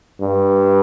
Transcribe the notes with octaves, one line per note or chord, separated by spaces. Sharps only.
G2